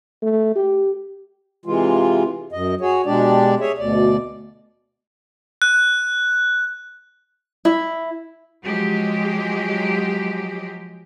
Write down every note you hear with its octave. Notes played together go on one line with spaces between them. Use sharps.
A3
G4
C3 E3 G#3 F4
F#2 D#5
F#4 G#4 C#5
B2 G#3 D4 G4 D5
G#4 C#5 E5
D2 B2 D5
F#6
E4
F3 F#3 G#3 G4